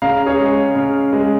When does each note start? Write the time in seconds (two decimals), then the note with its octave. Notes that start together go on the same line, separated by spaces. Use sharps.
0.02 C#3 F5 A#5
0.26 G#4 C#5
0.39 G#3
0.76 C#3
1.13 G#3